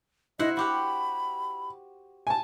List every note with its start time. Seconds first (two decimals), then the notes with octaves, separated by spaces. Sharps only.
0.39 E4 C5 D#5 F#5
0.57 F#4 G4 F#5 B5
2.27 G#5 A5